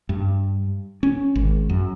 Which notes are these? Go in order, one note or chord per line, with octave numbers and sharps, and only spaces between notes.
G2
C#4
G#1
F#2